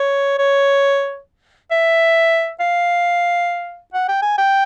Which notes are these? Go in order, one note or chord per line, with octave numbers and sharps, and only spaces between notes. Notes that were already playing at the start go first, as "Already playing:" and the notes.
Already playing: C#5
C#5
E5
F5
F#5
G5
G#5
G5